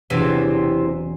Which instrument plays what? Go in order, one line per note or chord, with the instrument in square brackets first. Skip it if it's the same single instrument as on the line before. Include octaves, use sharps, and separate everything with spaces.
[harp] E1 F#3 [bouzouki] C3 E3 C4